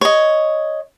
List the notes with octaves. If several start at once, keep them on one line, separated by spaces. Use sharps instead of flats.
C#5 D#5